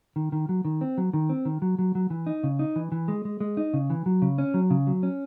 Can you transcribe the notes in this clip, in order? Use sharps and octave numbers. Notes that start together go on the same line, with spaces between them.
D#3
D#3
F#3
D#3
C4
F#3
D#3
C4
D#3
F#3
F#3
F#3
E3
D#4
C#3
D#4
E3
E3
G#3
G#3
G#3
D#4
C#3
E3
F#3
C#3
C#4
F#3
C#3
F#3
C#4